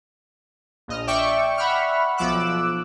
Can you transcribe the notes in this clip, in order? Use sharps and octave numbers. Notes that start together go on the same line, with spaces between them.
A#1 D#5 F6
D5 E5 G5 C#6 D6
E5 F#5 B5 C#6 F6
B1 F3 D6 E6 F#6